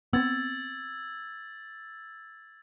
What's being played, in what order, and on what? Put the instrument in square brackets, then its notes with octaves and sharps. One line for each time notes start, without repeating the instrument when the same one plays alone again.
[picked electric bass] B3 C4 [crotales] E6 G#6 A6